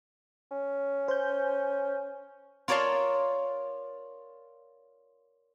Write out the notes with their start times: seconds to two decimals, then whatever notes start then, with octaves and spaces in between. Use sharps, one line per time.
0.51 C#4
1.08 C5 G6
2.68 F4 A#4 C#5 D5 A5 C6